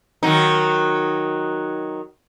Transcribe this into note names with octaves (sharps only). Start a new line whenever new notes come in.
D#3 F#3 D#4